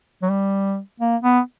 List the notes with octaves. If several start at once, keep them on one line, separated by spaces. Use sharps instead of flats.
F#3
G3
A#3
B3